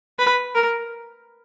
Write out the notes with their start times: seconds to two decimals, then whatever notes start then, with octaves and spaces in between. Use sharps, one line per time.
0.19 B4
0.55 A#4